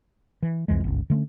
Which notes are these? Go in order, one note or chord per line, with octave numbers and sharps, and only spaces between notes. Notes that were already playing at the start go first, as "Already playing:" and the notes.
E3
C2 F2 E3 G#3
G1 C#2
D3 A3 A#3 C#4